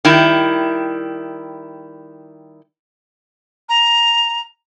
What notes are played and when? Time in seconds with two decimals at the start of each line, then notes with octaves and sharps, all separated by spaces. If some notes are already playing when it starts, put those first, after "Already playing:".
0.05 D#3 G3 E4
3.69 A#5